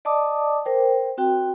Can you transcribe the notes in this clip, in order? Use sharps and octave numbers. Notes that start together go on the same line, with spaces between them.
D5 D#5 A5 D6 D#6
A#4 C5 G5
C4 F#4 G5